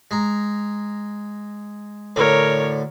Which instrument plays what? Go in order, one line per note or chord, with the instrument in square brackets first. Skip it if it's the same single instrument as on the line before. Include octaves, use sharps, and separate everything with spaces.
[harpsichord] G#3 A#5
[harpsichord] D2 A2 D3 [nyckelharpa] A#4 C#5